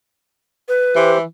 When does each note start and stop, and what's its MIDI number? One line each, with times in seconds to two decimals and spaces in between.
0.69 1.10 71
0.96 1.23 52
0.96 1.17 67
0.96 1.17 72